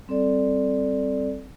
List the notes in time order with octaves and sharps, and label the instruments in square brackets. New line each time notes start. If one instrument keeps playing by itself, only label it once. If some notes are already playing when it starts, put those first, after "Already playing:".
[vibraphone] G3 C4 A4 D5